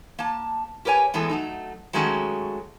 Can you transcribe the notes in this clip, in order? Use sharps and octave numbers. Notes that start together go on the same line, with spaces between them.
A#3 A5
G4 A#4 B4 C#5 G#5
A2 E3 G#3 B3 A4
F#3 A3 D#4
D#3 F#3 G#3 A3 C#4 F#4